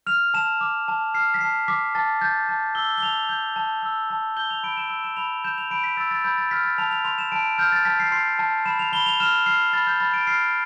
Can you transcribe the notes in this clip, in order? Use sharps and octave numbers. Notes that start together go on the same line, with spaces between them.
F6 F7
A5 E7
D6
A5
F6 C7
B6
A5 C7
D6 B6
A5 A6
G6 A6
A5
E6 G7
G7
A5 F7
G6
A5
E6
A5
G6 G7
F7
B5 D7
E7
E6
E7
B5 F7
G6 E7
F7
B5 D7
B6
E6 A6
A6
B5 G6
A6
F6 B6
A6
A5 F7
F7
C6 F7
E7
A5 D7
F6 G6
A6
A5 B6
C7
C6 C7
A5
B5 E7
F7
B5 G7
F7
F6 E7
F6 C7
B5 A6
G6
B5 A6
D7
F6 C7